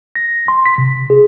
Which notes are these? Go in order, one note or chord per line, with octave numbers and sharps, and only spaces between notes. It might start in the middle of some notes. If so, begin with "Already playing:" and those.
A#6
C6
B6
C3
G#4